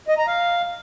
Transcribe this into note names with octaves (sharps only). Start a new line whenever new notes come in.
D#5
A#5
F5